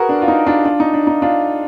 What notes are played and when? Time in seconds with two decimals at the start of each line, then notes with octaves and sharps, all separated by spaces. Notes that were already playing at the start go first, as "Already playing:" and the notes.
Already playing: F#4 G#4 A#4 B4
0.09 D4
0.22 F4
0.28 D#4
0.47 D4 F4
0.65 D4 F4
0.80 D#4
0.94 D4
1.07 D#4
1.22 D4 F4